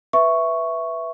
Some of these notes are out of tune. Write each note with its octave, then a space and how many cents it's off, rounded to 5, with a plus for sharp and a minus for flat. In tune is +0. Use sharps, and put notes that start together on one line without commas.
B4 +0 E5 +0 C#6 +0